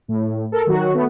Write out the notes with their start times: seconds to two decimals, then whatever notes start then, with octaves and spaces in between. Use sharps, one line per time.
0.08 A2
0.52 A4 A#4
0.67 D#3 F#3 F#4
0.94 A3 B3